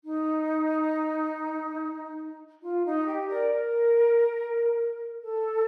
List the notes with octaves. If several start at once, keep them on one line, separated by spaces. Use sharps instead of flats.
D#4
F4
D#4
G4
A#4 D5
A#4
A4